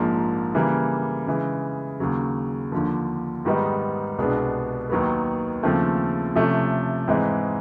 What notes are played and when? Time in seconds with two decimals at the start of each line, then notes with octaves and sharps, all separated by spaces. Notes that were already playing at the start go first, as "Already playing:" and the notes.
Already playing: A#1 G#2 F3 A#3
0.55 C#3 E3 G3 A#3
1.27 C#3 E3 G#3
2.00 D#2 C#3 F#3
2.72 D#2 D3 F3
3.45 G#2 D#3 G3 B3 D#4
4.18 C2 B2 G#3 B3 D4
4.90 D#2 D#3 F#3 B3
5.63 D#2 C#3 F3 A3 C4
6.35 C3 F3 A3 C#4
7.07 G#2 E3 G#3 C4 D#4